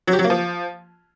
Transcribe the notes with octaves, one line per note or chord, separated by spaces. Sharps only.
F#3
G4
F#3
A#3
F3